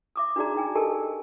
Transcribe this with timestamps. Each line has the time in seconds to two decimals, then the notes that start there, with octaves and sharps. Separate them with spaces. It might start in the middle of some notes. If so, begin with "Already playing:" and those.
0.16 E5 D6 D#6
0.36 D4 D#4 F#4 G#4 D5 A#5
0.55 D#4 G5 G#5
0.75 G4 A4 A#4 D#5 G#5 A5